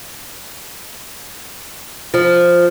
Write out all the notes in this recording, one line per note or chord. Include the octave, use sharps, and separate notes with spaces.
F3